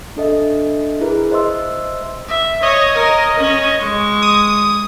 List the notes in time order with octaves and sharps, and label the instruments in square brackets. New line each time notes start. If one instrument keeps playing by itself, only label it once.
[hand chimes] D4 A4 D#5 E5
E4 G#4 A#4 B4
C5 D#5 E5 C6 E6
[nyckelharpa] E5
[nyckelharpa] C#5 [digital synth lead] D#5
[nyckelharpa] A#4 C#5
C#4 C#5
G#3 C#6
[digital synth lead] D#6